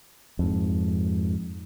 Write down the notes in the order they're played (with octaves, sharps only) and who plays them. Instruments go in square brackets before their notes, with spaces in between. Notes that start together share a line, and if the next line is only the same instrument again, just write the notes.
[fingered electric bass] F2 G#2